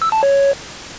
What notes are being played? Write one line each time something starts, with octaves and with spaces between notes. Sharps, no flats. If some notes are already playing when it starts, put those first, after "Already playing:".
E6
A5
C#5